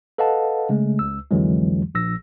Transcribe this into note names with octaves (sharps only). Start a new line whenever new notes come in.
A4 B4 D#5 F5 F#5 A5
C#3 G#3 A3
C#2 E6
C2 F2 D3 E3 F#3 G#3
A#1 E6 A#6